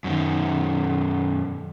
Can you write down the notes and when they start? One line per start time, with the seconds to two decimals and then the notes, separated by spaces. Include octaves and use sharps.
0.04 F#2 D#3